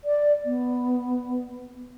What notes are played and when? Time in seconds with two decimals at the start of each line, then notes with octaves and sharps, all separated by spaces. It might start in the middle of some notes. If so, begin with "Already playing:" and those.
0.04 D5
0.45 B3